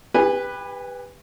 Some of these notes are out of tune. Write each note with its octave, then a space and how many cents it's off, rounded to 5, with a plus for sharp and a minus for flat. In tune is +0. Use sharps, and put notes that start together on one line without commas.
G4 +35 B4 +0 G#5 -15